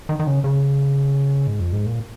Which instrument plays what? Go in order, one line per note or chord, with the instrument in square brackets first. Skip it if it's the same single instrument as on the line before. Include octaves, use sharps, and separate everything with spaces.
[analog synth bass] D#3
D#3
C#3
C#3
G#2
F2
G#2
A#2